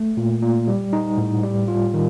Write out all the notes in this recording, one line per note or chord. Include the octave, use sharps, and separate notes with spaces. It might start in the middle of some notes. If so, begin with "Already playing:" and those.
Already playing: A3
A#2
A#2
G3
D#4
A2
G3
F4
D#3